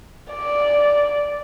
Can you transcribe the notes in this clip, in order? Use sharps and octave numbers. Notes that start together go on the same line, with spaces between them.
D5